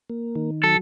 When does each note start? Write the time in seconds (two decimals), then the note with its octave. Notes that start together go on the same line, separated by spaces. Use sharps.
0.10 A#3
0.35 D#3
0.64 F#3 A4